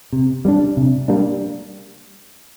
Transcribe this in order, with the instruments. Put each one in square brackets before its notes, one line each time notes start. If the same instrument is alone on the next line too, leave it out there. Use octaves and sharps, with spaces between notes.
[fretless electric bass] C3
G3 A#3 D4
C3
G3 A#3 D4